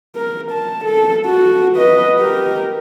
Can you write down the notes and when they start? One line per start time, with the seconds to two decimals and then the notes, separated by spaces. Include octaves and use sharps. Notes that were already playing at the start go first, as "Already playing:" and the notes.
0.16 A#4
0.52 A5
0.85 A4
1.26 F#4
1.77 B4 D#5
2.20 G4 A#4